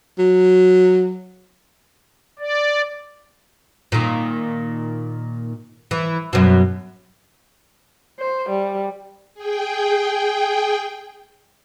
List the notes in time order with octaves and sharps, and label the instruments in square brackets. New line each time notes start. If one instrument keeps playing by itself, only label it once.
[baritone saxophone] F#3
[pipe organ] D5
[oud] A#2 D#3
E3
F#2 B2
[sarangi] C5
G3
[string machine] G#4 G5